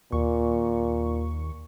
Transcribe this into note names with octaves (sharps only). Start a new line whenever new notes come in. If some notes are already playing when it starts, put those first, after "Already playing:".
D#2 A#2 C#6